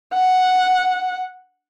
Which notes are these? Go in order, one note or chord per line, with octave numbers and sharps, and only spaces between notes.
F#5